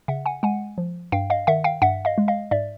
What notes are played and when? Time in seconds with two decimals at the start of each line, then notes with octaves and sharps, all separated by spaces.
0.08 C#3 E5 F#5
0.26 F#5 G#5
0.43 G#3 F#5 G#5
0.78 F3
1.12 G2 F5 G5
1.30 D#5 F5
1.47 D#3 E5 F#5
1.64 F5 G5
1.82 G2 E5 F#5
2.05 D#5 F5
2.18 G#3
2.28 D#5 F5
2.51 G#2 D5 E5